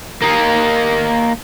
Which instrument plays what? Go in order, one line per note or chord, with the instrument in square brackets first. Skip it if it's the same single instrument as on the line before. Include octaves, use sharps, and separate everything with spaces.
[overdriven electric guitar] A#3 D#4